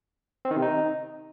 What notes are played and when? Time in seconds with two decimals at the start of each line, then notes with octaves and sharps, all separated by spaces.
0.45 C4
0.51 D#3
0.56 C3
0.62 D#4